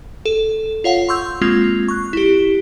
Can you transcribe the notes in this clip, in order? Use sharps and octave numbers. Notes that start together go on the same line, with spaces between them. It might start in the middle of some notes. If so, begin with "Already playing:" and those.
A4
F4 C#5 F5 F#5
C6 C#6 E6 G6
G#3 A#3 C4 F4
C#6 F#6
E4 G4